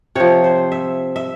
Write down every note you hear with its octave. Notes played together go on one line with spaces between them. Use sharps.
C3 F3 C#5
C5
E5
E5